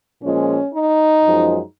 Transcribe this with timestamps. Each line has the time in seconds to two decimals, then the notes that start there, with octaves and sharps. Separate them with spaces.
0.21 A#2 F3 G#3 C#4
0.73 D#4
1.24 F#2 F3 G#3